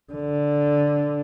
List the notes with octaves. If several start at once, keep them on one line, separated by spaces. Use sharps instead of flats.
D3